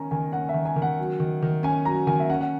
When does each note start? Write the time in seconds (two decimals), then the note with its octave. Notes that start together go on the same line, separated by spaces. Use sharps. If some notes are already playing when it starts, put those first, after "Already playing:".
Already playing: D#3 C#4 G#5 A#5
0.11 D#3 G#5
0.32 C#4 F#5
0.49 E5
0.54 D#3
0.65 G#5
0.76 D#3
0.82 F#5
0.99 F#3
1.20 D#3
1.42 D#3
1.63 C#4 G#5
1.85 F#3 A#5
2.07 D#3 G#5
2.19 E5
2.29 C#4 F#5
2.41 F#5